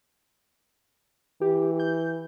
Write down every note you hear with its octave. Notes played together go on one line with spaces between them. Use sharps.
E3 G4
G6